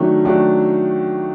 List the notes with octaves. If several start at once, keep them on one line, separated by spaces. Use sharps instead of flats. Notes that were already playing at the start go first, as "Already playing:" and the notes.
Already playing: D#3 F#3 A3 D4
D#3 F#3 A3 D4